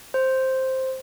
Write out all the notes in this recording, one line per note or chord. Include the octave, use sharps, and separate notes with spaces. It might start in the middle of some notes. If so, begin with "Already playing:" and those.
C5